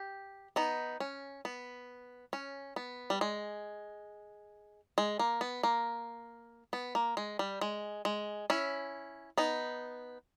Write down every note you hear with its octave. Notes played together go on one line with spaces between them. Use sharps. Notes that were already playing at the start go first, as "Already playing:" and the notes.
Already playing: G4
B3 D#4
C#4
B3
C#4
B3
G3
G#3
G#3
A#3
B3
A#3
B3
A#3
G#3
G3
G#3
G#3
C#4 E4
B3 D#4